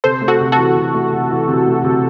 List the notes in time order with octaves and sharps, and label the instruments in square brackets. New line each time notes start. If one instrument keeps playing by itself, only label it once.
[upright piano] C3 [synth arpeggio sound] A4 C5
[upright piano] A3
[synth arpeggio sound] F#4 A4
[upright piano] C3
[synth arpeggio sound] F#4 A4
[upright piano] E3
C3
A3
C3
E3
C3
A3
C3